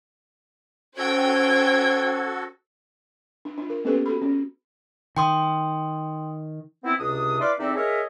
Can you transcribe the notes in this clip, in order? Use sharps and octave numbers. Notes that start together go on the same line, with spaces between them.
C#4 F#4 A4 C5 G5 G#6
D4
D4 F4
A#4
A#3 B3 C#4 G4 A4 B4
F#4 A4 B5
C#4
D#3 G5 C6 D#6
B3 C4 E4
C#2 C3 D4 D#6
E4 B4 D5 F5 C6 D6
E2 C4 D#4 A4 D5 E5
G#4 A#4 C#5 D#5 E5